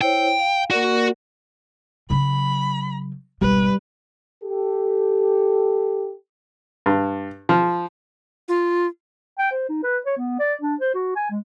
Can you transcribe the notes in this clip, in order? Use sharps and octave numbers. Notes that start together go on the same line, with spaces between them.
E4 C5 C#5 G5
F5
A#3 F#4 A#4 D5
C#3 F#3 B5
G#1 B2 G3 B4
G4 A4
G2
F3
F4
G5
C5
D#4
B4
C#5
B3
D5
D4
C5
F#4
G#5
G#3